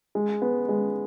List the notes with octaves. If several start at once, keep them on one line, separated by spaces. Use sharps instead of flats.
G#3
B3
G#3